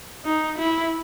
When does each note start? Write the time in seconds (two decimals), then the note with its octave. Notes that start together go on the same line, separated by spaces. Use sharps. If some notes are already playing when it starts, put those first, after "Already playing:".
0.25 D#4
0.58 E4